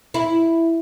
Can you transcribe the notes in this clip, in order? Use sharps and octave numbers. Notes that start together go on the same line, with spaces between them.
E4